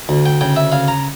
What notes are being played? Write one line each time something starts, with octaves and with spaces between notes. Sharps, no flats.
D2
G5
C#3 G5
E5
C#3 F5
A#5